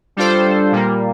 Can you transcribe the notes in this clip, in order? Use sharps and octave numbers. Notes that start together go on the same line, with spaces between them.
G3 D4 F4 A4 C5
A#2 G3 A#3